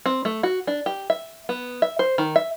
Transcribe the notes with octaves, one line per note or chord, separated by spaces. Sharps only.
C4
A3
F#4
D4
G4
E5
B3
E5
C5
D#3
E5